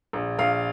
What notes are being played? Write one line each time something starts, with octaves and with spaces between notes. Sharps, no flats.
A#1
A#1 F5